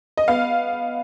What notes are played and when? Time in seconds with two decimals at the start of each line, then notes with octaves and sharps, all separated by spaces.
0.17 D#5
0.28 B3 F5